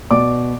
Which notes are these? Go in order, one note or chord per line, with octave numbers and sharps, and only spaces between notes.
B2 D5 D6